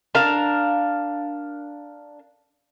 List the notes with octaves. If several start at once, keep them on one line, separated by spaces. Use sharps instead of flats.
D4 A#4 F5